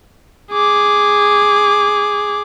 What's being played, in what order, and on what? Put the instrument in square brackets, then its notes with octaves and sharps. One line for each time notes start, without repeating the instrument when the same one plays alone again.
[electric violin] G#4 D6